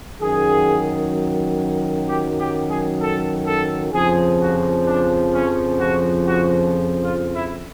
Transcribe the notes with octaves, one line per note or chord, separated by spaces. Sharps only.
F#2 D#3 F#3 G#4
G4
G4
G#4
A4
A4
F2 C#3 F3 G#4
F#4
D4
C#4
F#4
F#4
F4
E4